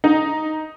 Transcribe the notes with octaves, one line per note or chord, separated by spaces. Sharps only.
D#4